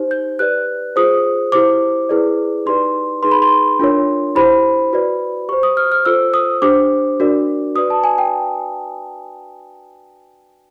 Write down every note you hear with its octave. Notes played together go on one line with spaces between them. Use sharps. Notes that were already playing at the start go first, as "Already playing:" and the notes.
Already playing: D#4 G4 C5
G6
G4 B4 D5 F#6
F4 G#4 C5 D#6
E4 G4 C5 D6
E4 G#4 B4 D5
D#4 G4 B4 D5 C6
D#4 G#4 B4 C6
B5
C6
D4 F4 A#4 C#5
E4 G4 C5 B5
F#4 B4 D5
G4 C5 C#6
D#6
F6
F6
F4 A4 C5 E6
D#6
D4 G4 C5 D6
D4 F#4 A#4 D5
F#4 B4 D5 D#6
A5
G#5
G5